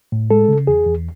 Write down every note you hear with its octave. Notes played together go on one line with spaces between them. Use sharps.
A2
G#3 A4
C#3
E2 G#4
E2